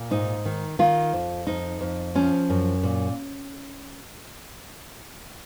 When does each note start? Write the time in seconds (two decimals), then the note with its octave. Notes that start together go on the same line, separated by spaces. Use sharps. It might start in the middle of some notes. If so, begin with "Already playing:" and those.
Already playing: A#2
0.11 G#2 D#4
0.45 D#3
0.79 D#3 F4
1.13 F2
1.47 F2 D#4
1.81 F2
2.15 F3 C#4
2.50 F#2
2.83 A#2